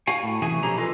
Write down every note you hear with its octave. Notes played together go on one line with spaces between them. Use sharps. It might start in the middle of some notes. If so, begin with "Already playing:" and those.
F#4 F5 G#5
A2
F#2 C3 E3 F#4 G#4 G#5
B2 D3 F3 G4 G#4 A#5
F4 A4 B4 D#5